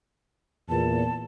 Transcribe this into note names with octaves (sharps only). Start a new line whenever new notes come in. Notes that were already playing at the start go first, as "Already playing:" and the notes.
E2 A#2 A5